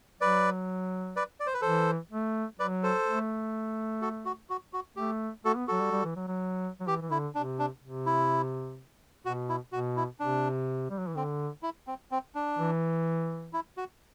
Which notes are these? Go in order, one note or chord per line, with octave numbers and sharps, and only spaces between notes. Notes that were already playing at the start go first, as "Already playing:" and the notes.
F#3 B4 D5
B4 D5
D5
C5
B4
E3 A4 C5
A3
F#3 B4 D5
A4 C5
A3
F#4 A4
F#4
F#4
F#4
A3 G4
A3 F#4 A4
B3
F#3 F#4 A4
G3
G3
E3
F#3
F#3
F#3
E3 G4
E3
D3 E4
C3 D4
D4
C3
E4
B2 F#4
E4
B2 F#4
E4
C3 D4
G3
F#3
E3
D3 C4
E4
C4
C4
D4
E3
E4
F#4